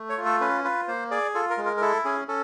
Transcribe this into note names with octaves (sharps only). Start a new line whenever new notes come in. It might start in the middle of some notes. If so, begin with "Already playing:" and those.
Already playing: A3
C#5
F4
A4
C#4 B4
F4 B4
A#3 C5
G#4 D5
F4 A4
A#4
G#3
A#4
A#4
E4 A4
C#4 G#4
C#4 A4